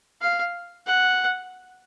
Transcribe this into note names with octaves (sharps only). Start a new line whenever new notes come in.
F5
F#5